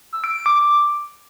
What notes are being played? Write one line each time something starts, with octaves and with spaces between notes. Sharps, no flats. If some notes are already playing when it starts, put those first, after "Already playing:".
E6
D7
D7
D6